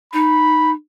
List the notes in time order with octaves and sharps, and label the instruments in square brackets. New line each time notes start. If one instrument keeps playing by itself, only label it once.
[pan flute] D#4 [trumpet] B5